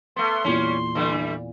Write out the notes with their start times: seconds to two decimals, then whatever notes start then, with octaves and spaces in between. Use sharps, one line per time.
0.16 A3 B3 C6
0.45 E2 A#2 G3 C#4
0.95 D3 E3 G3